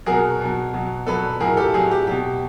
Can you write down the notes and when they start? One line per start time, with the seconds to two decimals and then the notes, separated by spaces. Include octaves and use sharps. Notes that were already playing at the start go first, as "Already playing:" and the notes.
0.06 B2 F#3 G#4 A#4
0.41 B2 F#3
0.74 B2 F#3
1.07 B2 F#3 A4 B4
1.40 A2 F#3 G#4 A#4
1.57 G4 A4
1.74 A2 F#3 G#4
1.91 G4
2.07 B2 F#3 G4